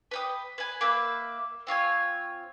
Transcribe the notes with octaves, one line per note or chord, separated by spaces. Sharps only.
B4 G5 D#6
B4 G#5
A#3 B4 E5
C4 F4 C#5 G#5